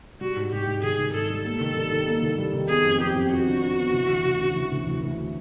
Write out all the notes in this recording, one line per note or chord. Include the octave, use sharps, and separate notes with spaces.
G3 F#4
G#2
G#2 G4
G#2
D#3 G#4
D#3
G#2 A4
G3
A#3 A4
D#3
G3
D#3
A#3
D#2
G3
D#3
B3 G#4
F2
F2 G4
F2
F2 F#4
D3
D3
B3
E3
D2
D2
C#3
E3
D2
E3
D2